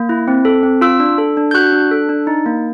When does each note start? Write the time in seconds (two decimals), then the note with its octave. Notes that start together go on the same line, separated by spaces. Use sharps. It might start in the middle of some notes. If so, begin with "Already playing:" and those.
Already playing: A#3
0.09 E4
0.28 C4
0.45 A4
0.63 C4
0.81 F4 E6
1.00 D4
1.18 A4
1.37 D4
1.51 G6
1.54 F#4 F#6
1.72 D4
1.91 A4
2.09 D4
2.27 D#4
2.46 A#3